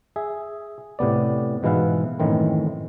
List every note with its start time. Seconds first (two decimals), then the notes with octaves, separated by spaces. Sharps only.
0.16 G#4 E5
0.99 A2 C3 B3 D5
1.63 G#2 B2 E3 E4 F5 F#5
2.19 F#2 A2 D#3 E3 C4